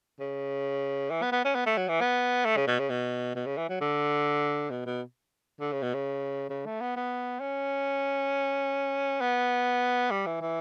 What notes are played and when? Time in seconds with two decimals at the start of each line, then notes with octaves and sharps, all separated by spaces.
0.20 C#3
1.10 E3
1.22 B3
1.32 B3
1.45 C#4
1.55 B3
1.66 A3
1.77 F#3
1.88 E3
2.01 B3
2.45 A3
2.57 C#3
2.67 B2
2.79 C#3
2.90 B2
3.35 B2
3.46 C#3
3.57 E3
3.69 F#3
3.81 D3
4.70 B2
4.86 B2
5.60 D3
5.72 C#3
5.83 B2
5.94 C#3
6.50 C#3
6.66 A3
6.81 B3
6.96 B3
7.40 C#4
9.21 B3
10.11 G3
10.26 E3
10.41 E3